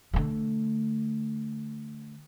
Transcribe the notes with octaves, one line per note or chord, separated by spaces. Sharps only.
D3 A3